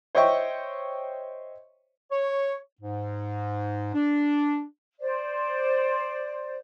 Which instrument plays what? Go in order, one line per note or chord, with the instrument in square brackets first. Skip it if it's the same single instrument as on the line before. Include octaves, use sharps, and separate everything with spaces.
[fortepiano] C5 C#5 D#5 E5 G5 C#6
[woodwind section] C#5
G#2
D4
[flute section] C5 D5